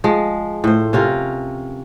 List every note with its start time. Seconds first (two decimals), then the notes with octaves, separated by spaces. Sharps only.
0.04 F3 G#3
0.64 A2 C5
0.93 C3 C#4 F4 A#4